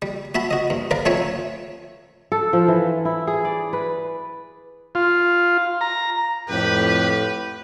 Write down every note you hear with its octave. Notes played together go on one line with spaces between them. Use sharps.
G3
F#4 E5 A5 B5
F#4 D#5
G2
A#4 B4 D5 F5
F3 A3 C4 C#4 C#5 E5
A4
F3
E3
E4
G#4
D5
B4
F4
A#5
F2 A2 G4 B4